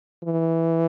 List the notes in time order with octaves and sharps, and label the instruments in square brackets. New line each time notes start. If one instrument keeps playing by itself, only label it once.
[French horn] E3